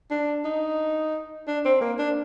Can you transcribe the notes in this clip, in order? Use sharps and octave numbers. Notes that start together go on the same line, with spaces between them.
D4
D#4
D4
C4
A#3
D4